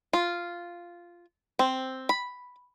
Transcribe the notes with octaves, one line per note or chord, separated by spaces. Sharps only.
F4
C4
B5